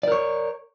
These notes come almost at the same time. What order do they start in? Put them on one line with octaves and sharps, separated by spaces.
D5 A#4 C#5